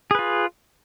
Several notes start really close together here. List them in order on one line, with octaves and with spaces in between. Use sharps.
G#4 B4 F4